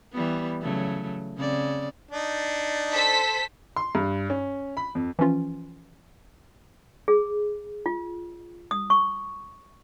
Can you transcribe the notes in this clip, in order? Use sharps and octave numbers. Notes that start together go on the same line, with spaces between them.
E3 G3 B3
C#3 F#3 A3
C#3 C4 D5
D4 D#4
A4 C5 B6
C6
G2
C#4
B5
F2
E3 F3 C#4 F4
G#4
F4
D#6
C#6